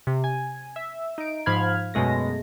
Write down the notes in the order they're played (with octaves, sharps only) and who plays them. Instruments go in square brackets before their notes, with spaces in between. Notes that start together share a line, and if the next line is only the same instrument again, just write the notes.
[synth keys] C3
G#5
E5
D#4 D7
G#2 F3 F5 B5 F6 G#6
F#2 B2 G#3 A3 A#6